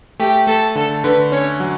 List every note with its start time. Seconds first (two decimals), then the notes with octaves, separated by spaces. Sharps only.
0.19 A3 G4
0.47 A3 A4
0.75 D3 A4
1.04 D3 B4
1.32 C#4 C#5
1.60 F#3